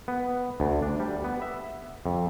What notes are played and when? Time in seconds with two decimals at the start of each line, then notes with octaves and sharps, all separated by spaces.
0.08 B3
0.60 D2
0.82 D4
1.00 G3
1.24 B3
1.42 E5
2.06 F2